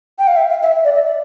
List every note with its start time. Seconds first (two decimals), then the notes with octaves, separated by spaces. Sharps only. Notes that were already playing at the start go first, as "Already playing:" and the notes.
0.19 G5
0.27 F5
0.37 E5
0.50 F5
0.62 E5
0.85 D5
0.95 E5
1.05 D5